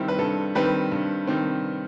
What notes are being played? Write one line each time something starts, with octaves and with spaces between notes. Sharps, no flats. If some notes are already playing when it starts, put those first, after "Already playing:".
Already playing: G2 D#3 G3 C4 E4
B4
G2 A4
D#3 G3 C4 B4
G2
D#3 G3 C4